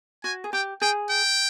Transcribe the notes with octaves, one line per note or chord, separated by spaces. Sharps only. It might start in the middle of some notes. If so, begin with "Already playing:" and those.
F#4 G#5
G#4
G4 G5
G#4 G5
G5